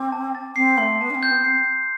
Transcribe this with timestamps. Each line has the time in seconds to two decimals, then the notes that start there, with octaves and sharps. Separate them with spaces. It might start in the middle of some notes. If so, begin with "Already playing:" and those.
Already playing: C4 D6
0.12 A5
0.35 A6
0.56 C4 C7
0.78 A3 C6
1.01 B3 A5
1.10 D4
1.15 C4
1.23 G6
1.31 B3
1.44 C4 C7